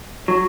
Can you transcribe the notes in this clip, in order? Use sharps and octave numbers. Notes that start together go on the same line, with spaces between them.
F#3